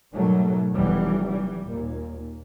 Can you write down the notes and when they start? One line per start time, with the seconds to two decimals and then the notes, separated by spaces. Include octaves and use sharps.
0.15 G#2 B2 D#3 F#3 G3 A3
0.72 F1 E3 F#3 G3 B3
1.26 E3 G3
1.66 D#2 A#2